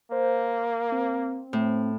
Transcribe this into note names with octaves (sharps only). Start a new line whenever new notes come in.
A#3 C5
C4
A2